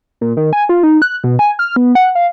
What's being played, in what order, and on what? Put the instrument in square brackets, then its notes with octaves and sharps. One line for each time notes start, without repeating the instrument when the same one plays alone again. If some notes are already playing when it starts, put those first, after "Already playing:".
[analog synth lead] A#2
D#3
G#5
F4
D#4
F#6
B2
G#5
F6
B3
F#5
F5